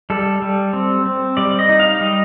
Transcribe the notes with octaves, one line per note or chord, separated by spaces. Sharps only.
G3 A4
G3
C4
C4
G3 D5
D#5
D#4
F5
G3 D#5